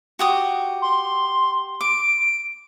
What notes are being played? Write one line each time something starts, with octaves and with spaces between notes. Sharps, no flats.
F#4 G4 D#6
C6
D6 D7